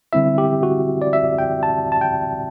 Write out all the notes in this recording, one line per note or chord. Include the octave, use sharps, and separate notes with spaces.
D3 G3 C4 E4 E5
G4
F#4
D5
E5
G5
A5
A5
G5